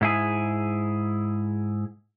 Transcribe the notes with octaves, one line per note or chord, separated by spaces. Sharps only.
G#2 E4 G#4